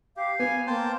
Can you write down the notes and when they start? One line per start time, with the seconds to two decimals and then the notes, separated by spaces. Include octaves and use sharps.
0.17 G4 F5
0.39 B3 G#5
0.67 A#3 C5 G5 A5